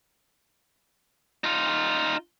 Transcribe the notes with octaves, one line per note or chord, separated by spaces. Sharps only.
D#4 F4